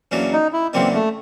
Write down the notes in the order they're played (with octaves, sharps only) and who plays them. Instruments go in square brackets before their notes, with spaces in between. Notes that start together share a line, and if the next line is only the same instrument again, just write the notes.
[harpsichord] E2 C#3 F#3 A#3 D4
[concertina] D#4
E4
[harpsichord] E2 C#3 F#3 A#3 D4 [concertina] C4
[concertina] A3